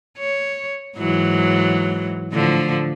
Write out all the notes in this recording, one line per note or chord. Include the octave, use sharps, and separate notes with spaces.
C#5
G#2 E3 F#3
A2 D3 F3